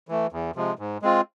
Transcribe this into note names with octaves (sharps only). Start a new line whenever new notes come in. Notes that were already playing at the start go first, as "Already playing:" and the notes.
E3 A3
E2
C3 F3 G#3
G#2
G#3 C4 F4